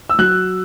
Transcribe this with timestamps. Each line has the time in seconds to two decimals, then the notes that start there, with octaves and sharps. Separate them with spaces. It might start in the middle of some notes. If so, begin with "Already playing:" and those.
0.10 E6
0.19 F#3 F#6